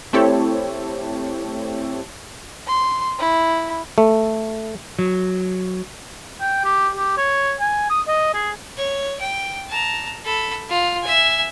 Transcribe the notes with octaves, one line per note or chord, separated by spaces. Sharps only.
A3 C4 E4 G4 A4 C#5
C6
E4
A3
F#3
G5
G4
G4
C#5
G#5
D#6
D#5
G#4
C#5
G5
A5 A#5
A4 B5
F4
E5 G#5